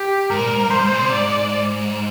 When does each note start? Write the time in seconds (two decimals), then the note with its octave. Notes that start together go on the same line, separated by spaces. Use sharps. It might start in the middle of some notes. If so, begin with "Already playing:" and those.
Already playing: G4
0.30 G#2 A#4
0.40 A#2
0.50 G#2
0.61 G2
0.71 G2 C5
0.81 G#2
0.91 A#2
1.02 C3
1.12 G#2 D5